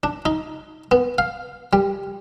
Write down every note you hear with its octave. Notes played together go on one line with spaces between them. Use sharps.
D4
D#4
B3
F5
G3